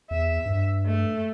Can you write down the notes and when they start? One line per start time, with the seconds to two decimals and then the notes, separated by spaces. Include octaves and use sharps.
0.11 E2 E5
0.46 G2
0.86 A3